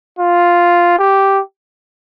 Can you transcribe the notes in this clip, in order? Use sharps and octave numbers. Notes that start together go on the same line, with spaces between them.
F4
G4